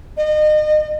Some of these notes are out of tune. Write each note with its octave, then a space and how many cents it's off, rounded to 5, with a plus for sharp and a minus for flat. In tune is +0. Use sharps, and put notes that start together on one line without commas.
D#5 -30